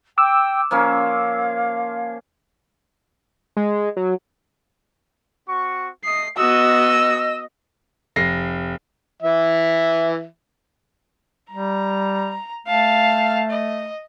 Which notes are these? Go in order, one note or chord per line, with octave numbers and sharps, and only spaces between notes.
G5 D6 E6
F3 A#3 C#4 F5
G#3
F#3
C4 F#4 C#6
A3 D#5 D#6 C7
B3 F#4 D#5 E6
F1 A#6 C7
E3 E5
G3 A#5
A3 F5 A5
D#5